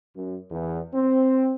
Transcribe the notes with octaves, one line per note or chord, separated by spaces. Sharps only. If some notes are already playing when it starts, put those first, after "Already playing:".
F#2
E2
C4